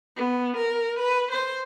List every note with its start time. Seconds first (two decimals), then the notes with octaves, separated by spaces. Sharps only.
0.17 B3
0.57 A#4
0.99 B4
1.31 C5